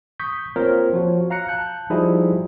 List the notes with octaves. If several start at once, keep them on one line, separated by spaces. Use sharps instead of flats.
C#6 D#6 G6 B6
A#3 C4 F4 A#4 C5 C#5
F3 F#4 C#5
F5 A#5 F#6 C#7
A5 F#6 G6
F3 G3 D#4 E4 F#4 G#4